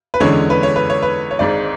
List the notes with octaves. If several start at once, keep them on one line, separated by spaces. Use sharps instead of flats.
B4
E2 D3 G#3 C#4 C#5
B4
C#5
B4
C#5
B4
C#5
G#1 G#2 G#3 D5